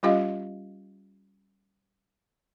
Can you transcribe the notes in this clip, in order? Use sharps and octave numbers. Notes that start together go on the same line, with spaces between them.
G3 C#4 F4 G4 D#5 F5